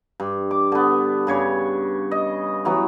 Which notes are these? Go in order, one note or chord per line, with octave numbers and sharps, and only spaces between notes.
G2
D6
D3 B3
G2 C#3 C#5
D#5
E3 F#3 B3